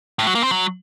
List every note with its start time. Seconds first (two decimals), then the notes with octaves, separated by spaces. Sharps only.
0.19 A2
0.27 F#3
0.35 A#3
0.43 C4
0.51 F#3